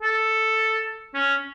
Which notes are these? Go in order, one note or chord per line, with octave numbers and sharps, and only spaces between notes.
A4
C#4